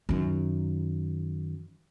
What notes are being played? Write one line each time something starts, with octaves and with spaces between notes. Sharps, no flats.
F#2 D#3